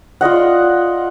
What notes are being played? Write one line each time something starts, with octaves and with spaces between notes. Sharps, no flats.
F4 D5 D#5 F#5